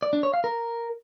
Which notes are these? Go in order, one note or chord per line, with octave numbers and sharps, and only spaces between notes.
D5
D4
C#5
F5
A#4